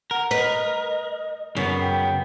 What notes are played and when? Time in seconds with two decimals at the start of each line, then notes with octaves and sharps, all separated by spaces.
0.11 A#4 F#5
0.31 B4 D#5
1.57 F#2 C#3 B3
1.81 G5